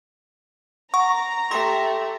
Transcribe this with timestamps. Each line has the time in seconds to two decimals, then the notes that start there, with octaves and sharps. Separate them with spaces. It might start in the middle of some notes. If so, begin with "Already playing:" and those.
0.94 F#5 A#5 C#6
1.51 A3 G4 C6 A#6